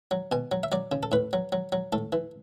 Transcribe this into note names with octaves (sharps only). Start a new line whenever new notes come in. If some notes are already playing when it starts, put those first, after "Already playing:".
F#3
B2 G#5
F#3
E5
F#3 D5
C#3
A4
A2 B4
F#3
F#3
F#3
A2 A4
E3